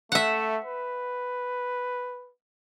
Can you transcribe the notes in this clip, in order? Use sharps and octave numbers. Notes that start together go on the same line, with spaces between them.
A3 E5 F#5
B4